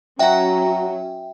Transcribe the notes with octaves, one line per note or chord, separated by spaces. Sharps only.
F#3 C#4 F#4 E5 G5 A#5